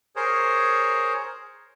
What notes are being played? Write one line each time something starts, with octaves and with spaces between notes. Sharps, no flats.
G#4 A#4 C5 C#5